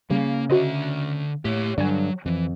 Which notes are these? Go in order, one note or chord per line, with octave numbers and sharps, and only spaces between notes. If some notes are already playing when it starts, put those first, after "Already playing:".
C#3 G3 A#3
D3 F#4 C5 D#5 E5
A2 G4 C#5
G2 D3 F#3 D5 G#5
F2 E3